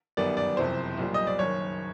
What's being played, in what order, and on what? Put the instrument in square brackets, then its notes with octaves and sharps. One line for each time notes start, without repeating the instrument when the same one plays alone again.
[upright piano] G1 F#2 D#3 G3 B3 [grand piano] D5
[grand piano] D5
[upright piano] F#1 F2 C3 E3 [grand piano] C5
[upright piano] B1 A#2 G3
[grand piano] D#5
D5
[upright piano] F#1 F#2 D#3 [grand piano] C#5